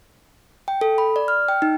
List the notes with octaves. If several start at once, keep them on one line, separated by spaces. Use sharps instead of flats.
G5
A4
B5
D5
F6
G5
D#4